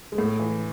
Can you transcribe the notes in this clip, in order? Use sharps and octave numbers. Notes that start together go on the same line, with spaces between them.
G#3
A2 A3
E3